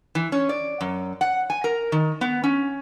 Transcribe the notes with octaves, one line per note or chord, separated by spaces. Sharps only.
E3
C#4
D5
F#2
F#5
G#5
A#4
D#3
B3
C#4